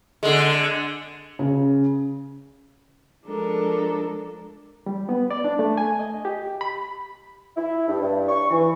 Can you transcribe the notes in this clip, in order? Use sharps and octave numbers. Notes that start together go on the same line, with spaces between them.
D3 G#3
C#3
F3 G#3 D4 A4 A#4
G3
B3
D5
D4
A3
G#5
D#5
G4
B5
E4
G2
G2
C#6
E3